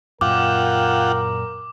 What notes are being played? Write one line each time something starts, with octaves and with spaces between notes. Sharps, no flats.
F#2 A#2 F4 A#4 F#5 G5 D6